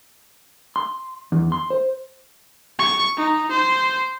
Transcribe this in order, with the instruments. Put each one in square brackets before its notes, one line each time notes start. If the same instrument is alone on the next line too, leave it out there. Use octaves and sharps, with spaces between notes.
[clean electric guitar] C6
E2
C6
C5
[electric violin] C#6
D#4
C5